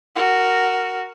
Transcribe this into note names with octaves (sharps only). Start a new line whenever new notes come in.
F#4 A#4